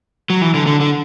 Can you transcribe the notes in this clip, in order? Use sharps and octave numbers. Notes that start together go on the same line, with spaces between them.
F#3
E3
D3
D3
D3